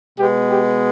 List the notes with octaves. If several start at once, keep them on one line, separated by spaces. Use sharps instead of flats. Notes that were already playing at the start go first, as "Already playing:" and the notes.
B2 G#3 B3 G4
G4